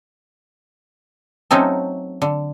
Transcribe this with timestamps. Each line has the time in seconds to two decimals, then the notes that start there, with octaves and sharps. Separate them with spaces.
1.51 F#3 A3 C4 C#4 D#4 A4
2.22 D3